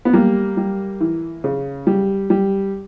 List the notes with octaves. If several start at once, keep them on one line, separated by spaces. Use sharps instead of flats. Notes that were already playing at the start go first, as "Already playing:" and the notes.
B3
G3 A#3
G3
E3
C#3
G3
G3